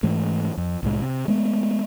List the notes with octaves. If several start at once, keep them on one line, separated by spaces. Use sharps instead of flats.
G#2 E3 A3
F2
C2 A2 G#3
C3
G#3 A3 B3